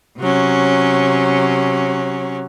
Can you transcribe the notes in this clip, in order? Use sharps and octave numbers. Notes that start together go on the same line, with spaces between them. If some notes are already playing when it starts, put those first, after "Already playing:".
C3 F#3 C#4